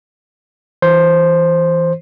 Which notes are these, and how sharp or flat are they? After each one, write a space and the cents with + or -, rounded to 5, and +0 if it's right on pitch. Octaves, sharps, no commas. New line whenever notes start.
E3 +0 C5 +5